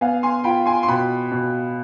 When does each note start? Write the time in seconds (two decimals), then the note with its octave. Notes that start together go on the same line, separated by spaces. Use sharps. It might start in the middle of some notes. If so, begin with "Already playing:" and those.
0.01 B3 F5 G#5
0.23 G#5 C6
0.44 F4 G5 B5
0.66 G#5 C6
0.83 C6
0.88 B2 G5 B5
1.32 B2